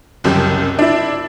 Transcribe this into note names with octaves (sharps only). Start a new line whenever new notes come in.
F#1 C2 F#2 G4
D4 E4